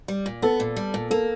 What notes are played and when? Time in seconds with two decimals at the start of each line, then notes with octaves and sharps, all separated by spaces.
0.08 G3
0.26 A#2
0.42 B3 A4
0.60 A#2
0.76 G3
0.94 A#2
1.10 A#3 A4